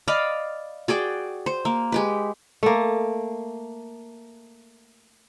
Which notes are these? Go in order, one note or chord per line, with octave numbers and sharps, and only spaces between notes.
D5 D#5 F5 B5
F#4 G#4 D5 G5
C5
A#3
G#3 G4 B4
A3 A#3